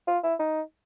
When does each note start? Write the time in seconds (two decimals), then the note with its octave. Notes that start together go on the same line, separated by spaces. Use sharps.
0.08 F4
0.24 E4
0.39 D#4